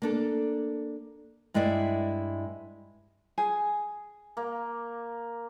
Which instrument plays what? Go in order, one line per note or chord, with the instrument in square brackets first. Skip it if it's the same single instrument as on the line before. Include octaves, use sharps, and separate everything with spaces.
[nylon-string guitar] A#3 D4 A4
G2 G#3 E4 D5 E5
[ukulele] G#4
[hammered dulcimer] A#3